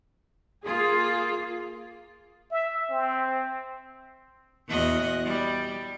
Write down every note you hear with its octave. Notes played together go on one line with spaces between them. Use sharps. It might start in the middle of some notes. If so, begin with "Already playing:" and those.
A#3 F4 G#4
E5
C4
E2 F#4 D#5
G3